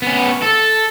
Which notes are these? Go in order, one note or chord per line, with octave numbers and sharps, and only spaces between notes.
B3 C#4
A4